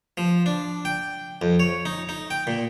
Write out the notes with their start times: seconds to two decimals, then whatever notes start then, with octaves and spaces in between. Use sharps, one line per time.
0.18 F3
0.46 D4
0.85 G5
1.42 F2
1.60 C#5
1.86 D#4
2.09 D#4
2.31 G5
2.47 A#2